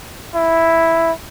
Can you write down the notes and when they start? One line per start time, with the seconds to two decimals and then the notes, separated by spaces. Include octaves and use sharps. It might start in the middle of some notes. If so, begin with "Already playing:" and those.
0.35 E4